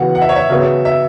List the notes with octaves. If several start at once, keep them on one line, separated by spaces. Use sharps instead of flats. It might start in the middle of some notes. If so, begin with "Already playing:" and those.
Already playing: C#3 E3 B3 F#4 F#5
F#5
E5
C#5
E5
C#3 F#3 B3 G#4 C#5
E5